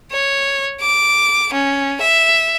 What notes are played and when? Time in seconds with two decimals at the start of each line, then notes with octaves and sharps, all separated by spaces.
0.12 C#5
0.82 D6
1.54 C#4
2.01 E5